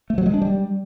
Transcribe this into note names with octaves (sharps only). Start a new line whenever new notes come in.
A3
F#3
G#3
D4
G3